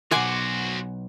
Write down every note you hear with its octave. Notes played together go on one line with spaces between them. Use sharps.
B1 F#4 C5 F#5 G#5 C6 D6